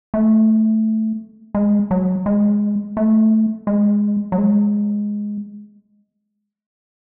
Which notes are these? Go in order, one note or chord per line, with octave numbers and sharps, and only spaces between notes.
A3
G#3
F#3
G#3
A3
G#3
F#3
G#3